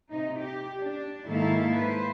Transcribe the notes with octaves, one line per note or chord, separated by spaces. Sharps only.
C3 D#4
G4
D4
G#2 D#3 A#3 E4 A4 F5
B4 C5